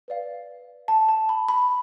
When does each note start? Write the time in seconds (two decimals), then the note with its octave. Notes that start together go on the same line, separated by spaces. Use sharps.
0.08 B4 D5 F5
0.88 A5
1.09 A5
1.29 B5
1.48 B5